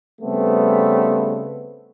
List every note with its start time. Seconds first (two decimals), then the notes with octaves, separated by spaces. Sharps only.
0.22 C#3 G3 A3 B3 C4